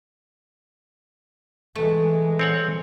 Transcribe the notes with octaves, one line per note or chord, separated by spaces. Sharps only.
E3 G#3 A3
C4 C#5 F#5